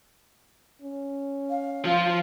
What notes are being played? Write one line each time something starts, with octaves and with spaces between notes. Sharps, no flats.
C#4
F5
F3 F4